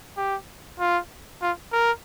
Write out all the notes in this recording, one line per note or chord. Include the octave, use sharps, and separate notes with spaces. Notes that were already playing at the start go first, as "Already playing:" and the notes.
G4
F4
F4
A#4